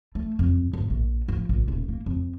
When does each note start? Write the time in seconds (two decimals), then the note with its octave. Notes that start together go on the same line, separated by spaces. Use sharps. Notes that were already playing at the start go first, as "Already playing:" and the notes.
0.15 A3
0.39 F2
0.73 G1
0.90 A#1
1.28 F3
1.49 A#1
1.68 D#1
1.88 A#3
2.06 F2